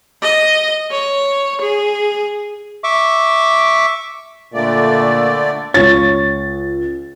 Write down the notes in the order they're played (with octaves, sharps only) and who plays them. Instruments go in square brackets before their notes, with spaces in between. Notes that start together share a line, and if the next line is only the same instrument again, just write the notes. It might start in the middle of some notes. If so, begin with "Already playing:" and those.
[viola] D#5
C#5
G#4
[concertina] E5 C#6 D6
[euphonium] A#2 [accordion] D3 A3 D5
[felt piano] C#2 A6 [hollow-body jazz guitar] C#5